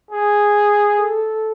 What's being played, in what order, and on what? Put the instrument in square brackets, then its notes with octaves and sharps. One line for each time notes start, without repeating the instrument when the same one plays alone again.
[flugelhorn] G#4
[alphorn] A4